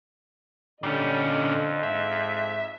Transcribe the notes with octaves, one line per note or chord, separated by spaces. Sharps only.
A#2 D3 G3 C#4 D#5
F2
G#2 E5